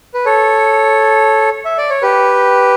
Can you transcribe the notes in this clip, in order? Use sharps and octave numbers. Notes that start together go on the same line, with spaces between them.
B4
A4 C#5
E5
D5
C#5
G4 B4